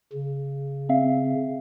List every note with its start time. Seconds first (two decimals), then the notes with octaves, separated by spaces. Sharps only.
0.13 C#3
0.89 C4 E5 F5